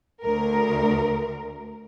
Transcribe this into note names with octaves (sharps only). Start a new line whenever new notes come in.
D2 A#4